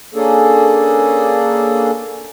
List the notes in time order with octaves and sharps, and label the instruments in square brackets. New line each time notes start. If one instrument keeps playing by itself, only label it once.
[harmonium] A#3 C#4 D4 G#4 A4